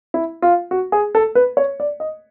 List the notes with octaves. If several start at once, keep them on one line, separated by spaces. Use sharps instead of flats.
E4
F4
F#4
G#4
A4
B4
C#5
D5
D#5